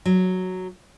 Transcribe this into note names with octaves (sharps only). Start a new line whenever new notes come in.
F#3